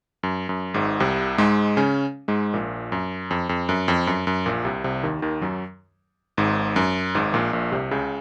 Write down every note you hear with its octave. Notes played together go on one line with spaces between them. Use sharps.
F#2
F#2
G#1 G#2
C2 C3
G#2 G#3
C#3 C#4
G#2 G#3
A#1 A#2
F#2
F2
F2
F#2
F2
F#2
F#2
A#1 A#2
C2 C3
C2 C3
D#2 D#3
D#2 D#3
F#2 F#3
G#1 G#2
F#2
G#1 G#2
A#1 A#2
A#1 A#2
C2 C3
C#2 C#3